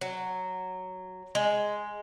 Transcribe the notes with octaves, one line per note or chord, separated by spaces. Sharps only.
F#3
G#3